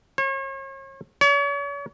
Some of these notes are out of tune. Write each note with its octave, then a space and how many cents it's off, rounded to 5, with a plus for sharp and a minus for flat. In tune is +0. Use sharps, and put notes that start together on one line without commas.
C#5 -40
C#5 +40